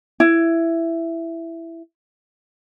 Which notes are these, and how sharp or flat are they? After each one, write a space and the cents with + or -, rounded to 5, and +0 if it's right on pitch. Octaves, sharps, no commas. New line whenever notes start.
E4 +10